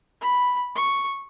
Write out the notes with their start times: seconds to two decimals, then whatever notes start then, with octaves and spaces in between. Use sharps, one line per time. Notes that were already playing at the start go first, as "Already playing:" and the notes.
0.21 B5
0.75 C#6